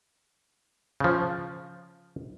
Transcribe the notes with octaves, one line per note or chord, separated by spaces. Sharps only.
C#3 F3